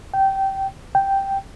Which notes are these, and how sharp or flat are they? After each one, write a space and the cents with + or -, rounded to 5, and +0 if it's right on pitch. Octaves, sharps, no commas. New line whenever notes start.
G5 -15
G5 +0